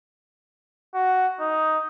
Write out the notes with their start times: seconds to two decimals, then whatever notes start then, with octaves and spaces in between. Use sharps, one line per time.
0.94 F#4
1.40 D#4